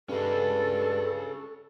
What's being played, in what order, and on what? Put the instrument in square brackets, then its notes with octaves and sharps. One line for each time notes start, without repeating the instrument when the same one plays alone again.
[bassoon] G2 [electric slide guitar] C#4 G#4 D#5 [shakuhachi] A4